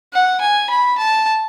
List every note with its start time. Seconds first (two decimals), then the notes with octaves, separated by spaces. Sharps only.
0.13 F#5
0.41 G#5
0.70 B5
0.98 A5